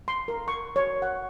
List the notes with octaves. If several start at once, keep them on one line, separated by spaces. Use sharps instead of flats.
C6
A#4
C#6
C#5
F#5